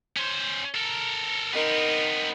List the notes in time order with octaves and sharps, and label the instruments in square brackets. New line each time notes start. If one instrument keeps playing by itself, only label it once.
[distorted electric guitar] C#4 C5
A4 A#4
[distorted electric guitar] B3 C4 [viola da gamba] D#4 A#4